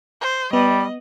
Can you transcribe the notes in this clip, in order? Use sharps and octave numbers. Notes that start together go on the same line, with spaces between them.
C5
G3 B3 D#5